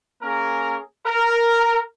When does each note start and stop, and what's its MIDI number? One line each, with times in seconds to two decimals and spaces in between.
0.22 0.78 58
0.22 0.78 61
0.22 0.78 68
0.22 0.78 70
1.06 1.80 70